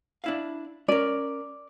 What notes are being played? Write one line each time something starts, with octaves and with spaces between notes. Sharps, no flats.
D4 E4 F5
C#4 A#4 D5